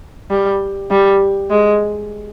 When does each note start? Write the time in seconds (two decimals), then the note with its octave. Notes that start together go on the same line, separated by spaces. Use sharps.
0.30 G3
0.90 G3
1.51 G#3